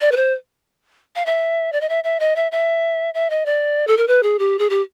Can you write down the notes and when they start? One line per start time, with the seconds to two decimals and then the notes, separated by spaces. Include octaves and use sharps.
0.01 D5
0.12 B4
0.16 C5
1.16 F5
1.26 E5
1.73 D5
1.81 D#5
1.89 E5
2.04 E5
2.20 D#5
2.36 E5
2.52 E5
3.14 E5
3.30 D#5
3.46 D5
3.87 A4
3.97 A#4
4.08 B4
4.23 G#4
4.39 G4
4.59 G#4
4.70 G4